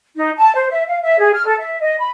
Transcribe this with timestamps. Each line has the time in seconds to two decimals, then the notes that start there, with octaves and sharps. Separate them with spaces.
0.16 D#4
0.37 A5
0.55 C5
0.71 E5
0.87 F5
1.02 E5
1.20 G#4
1.33 F6
1.46 A4
1.59 E5
1.80 D#5
1.99 B5